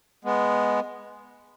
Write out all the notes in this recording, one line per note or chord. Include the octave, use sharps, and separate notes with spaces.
G#3 B3